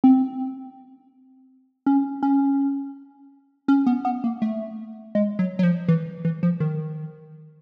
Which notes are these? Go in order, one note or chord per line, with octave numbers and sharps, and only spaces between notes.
C4
C#4
C#4
C#4
B3
B3
A#3
A3
G#3
F#3
F#3
F3
E3
E3
F3
D#3